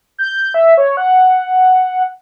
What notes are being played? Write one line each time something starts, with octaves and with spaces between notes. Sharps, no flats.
G6
E5
C#5
F#5